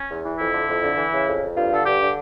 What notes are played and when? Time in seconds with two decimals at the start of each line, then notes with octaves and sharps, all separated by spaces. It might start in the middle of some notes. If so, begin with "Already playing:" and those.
Already playing: C#4
0.09 E2
0.24 E3
0.38 F2 E4
0.52 D3
0.67 F2
0.83 D3
0.96 E3
1.11 C#3
1.27 F2
1.41 F2
1.56 G2 F4
1.70 D3 A4
1.85 G2 G4
2.00 D3